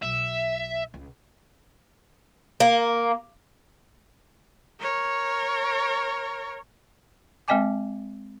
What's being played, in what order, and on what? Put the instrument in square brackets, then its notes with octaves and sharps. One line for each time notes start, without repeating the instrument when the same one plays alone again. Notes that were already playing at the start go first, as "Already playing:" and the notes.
[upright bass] B1 [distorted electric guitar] E5
[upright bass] C#2
[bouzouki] A#3
[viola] A#4 C#5
[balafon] G#3 C4 D#5 G5 G#5 D6